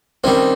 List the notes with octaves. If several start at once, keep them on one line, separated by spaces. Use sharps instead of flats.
D#3 G3 C4 C#4